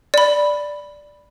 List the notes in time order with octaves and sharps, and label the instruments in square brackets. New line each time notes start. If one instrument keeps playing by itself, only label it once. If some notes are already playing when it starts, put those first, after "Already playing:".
[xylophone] D5 B5